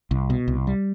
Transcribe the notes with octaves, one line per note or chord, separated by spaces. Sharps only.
C2
B2
C2
G3